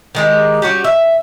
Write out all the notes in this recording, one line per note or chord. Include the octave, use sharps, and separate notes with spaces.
D#3 G#3 G4
G3 C#4 F#4 G4
E5